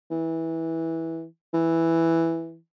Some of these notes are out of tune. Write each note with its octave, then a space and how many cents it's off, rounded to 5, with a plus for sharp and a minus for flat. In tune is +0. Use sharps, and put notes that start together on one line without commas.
E3 -15
E3 +0